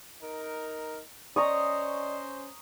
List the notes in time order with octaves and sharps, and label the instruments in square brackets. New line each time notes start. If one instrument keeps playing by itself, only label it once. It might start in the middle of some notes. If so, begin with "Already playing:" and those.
[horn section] D#4 A#4
[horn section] C#4 C5 [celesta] D5 D#5 [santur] A#5 C#6 D#6